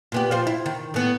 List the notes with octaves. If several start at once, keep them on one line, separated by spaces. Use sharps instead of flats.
A#2 B3 G4
F3 F4 C5
E4
D#3
A2 B3